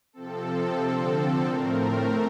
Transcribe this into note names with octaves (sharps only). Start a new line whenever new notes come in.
C3 F3 C4 A4
D3 F3 C4
A2 A3 C4 A#4